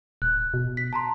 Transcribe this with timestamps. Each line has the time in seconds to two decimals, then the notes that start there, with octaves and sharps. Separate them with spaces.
0.22 D#1 F#6
0.54 B2
0.77 B6
0.93 A5 A#5 C6